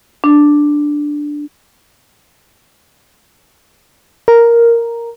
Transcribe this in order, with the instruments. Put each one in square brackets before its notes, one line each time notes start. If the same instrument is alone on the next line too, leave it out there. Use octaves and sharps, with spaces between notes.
[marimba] D4
[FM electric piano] A#4